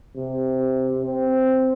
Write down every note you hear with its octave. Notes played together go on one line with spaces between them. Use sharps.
C3
C4